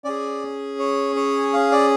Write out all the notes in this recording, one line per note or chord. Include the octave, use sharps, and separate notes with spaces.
C#4 G#4 D5
C#5
C#5
F5
D5